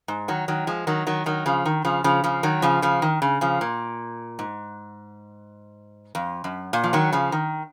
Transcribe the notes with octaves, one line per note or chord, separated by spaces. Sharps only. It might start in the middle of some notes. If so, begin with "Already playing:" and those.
G#2
D#3 F#3
D#3 F#3
F3 G#3
D#3 F#3
D#3 F#3
D#3 F#3
C#3 F3
D#3
C#3 F3
C#3 F3
C#3 F3
D#3 F#3
C#3 F3
C#3 F3
D#3
C#3
C#3 F3
A#2
G#2
F2
F#2
A#2
F3
D#3 F#3
C#3 F3
D#3